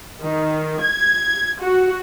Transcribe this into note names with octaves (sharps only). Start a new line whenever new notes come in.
D#3
G#6
F#4